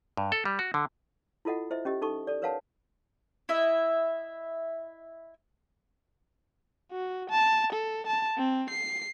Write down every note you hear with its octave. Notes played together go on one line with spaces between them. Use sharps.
G2
A4
G3
F#4
D3
E4 F4 A4 D#5 F#5
E4 C5 D#5 E5
C#4 G4 D#5
D#4 A4 C#6
A4 D5
A#4 B4 C#5 F5 F#5 A5
E4 D#5 E5
F#4
A5
A4
A5
C4
C7